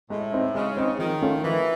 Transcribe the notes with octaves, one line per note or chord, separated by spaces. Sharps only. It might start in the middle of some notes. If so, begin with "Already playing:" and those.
A2 G#3
C4 D#4
C#3 G#3
C4 D#4
D#3 F3
A3 C#4 F4
E3 F3